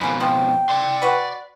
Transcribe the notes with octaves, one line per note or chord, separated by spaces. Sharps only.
F2 B2 A#3 G#5 B5
F3 G5
D5 C6
F#4 B4